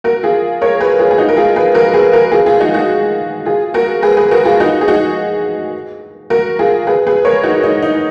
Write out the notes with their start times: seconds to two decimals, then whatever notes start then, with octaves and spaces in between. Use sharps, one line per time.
0.04 F#4 A#4
0.23 F4 G#4
0.61 A#4 C#5
0.80 G#4 B4
0.99 F4 G#4
1.11 G#4
1.18 D#4 F#4
1.29 A#4
1.37 F4 G#4
1.56 G#4 B4
1.74 F#4 A#4
1.94 G#4 B4
2.13 F#4 A#4
2.32 F4 G#4
2.46 F4 G#4
2.60 D#4 F#4
2.74 D#4 F#4
3.45 F4 G#4
3.74 F#4 A#4
4.02 G#4 B4
4.17 G#4 B4
4.31 F#4 A#4
4.45 F4 G#4
4.60 D#4 F#4
4.81 G#4
4.88 D#4 F#4
6.30 F#4 A#4
6.59 F4 G#4
6.87 G#4 B4
7.07 G#4 B4
7.25 A#4 C#5
7.43 D#4 F#4
7.63 D#4
7.82 D#4